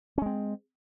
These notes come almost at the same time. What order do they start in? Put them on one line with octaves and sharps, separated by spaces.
C#4 G#3 C4